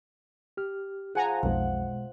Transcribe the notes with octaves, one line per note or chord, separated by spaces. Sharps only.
G4 F6
F3 G#4 F#5 G#5 A#5
B1 F2 B2 G#3 F#5